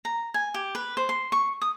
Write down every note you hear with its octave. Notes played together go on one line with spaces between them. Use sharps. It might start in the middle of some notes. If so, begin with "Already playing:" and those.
A#5
G#5
G4
B4
C5
C6
C#6
D#6